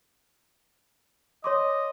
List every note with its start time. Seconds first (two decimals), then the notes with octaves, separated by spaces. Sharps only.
1.44 C#5 D#5 C6 D6